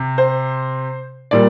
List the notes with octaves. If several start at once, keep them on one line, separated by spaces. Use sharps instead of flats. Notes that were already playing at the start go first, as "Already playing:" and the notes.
Already playing: C3
C5
A#2 G3 D5